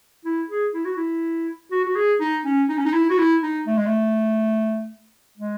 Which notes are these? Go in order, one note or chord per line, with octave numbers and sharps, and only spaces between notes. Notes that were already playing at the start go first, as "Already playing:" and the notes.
E4
G#4
E4
F#4
E4
F#4
F#4
G#4
D#4
C#4
D#4
C#4
D#4
E4
F#4
E4
D#4
A3
G#3
A3
G#3